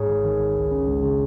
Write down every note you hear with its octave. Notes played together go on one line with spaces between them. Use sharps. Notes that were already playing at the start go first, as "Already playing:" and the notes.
Already playing: G#2 G#4 C#5
G#1
D#3
G#1
C#2
C#4
C#2
C#3